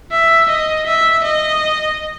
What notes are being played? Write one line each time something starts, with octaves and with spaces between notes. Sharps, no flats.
E5
D#5
E5
D#5